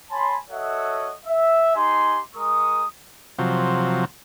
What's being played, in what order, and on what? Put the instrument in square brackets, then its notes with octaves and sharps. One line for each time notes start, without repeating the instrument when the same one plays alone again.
[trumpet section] C#5 G#5 A5 B5 C6
F#4 A4 C#5 D#5 E5 F#5
E5
D#4 G4 G#5 C6
G#3 A#4 C#6 D#6
[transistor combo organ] C3 F3 F#3